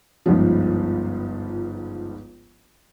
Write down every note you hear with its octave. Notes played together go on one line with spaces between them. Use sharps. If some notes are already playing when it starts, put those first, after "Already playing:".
G1 C#2 G#2 F3